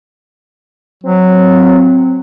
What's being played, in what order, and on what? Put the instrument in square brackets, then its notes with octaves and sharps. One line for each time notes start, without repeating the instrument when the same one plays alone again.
[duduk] F#3 [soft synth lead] C4